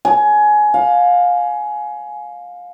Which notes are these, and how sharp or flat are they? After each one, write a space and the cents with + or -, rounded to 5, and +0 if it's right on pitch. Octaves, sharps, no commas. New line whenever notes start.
G#5 +20
F5 +25